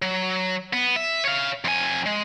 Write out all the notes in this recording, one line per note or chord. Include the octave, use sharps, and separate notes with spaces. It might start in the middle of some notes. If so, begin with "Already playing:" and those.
F#3
B3
E5
C#5 F5
F2 G#5
G#3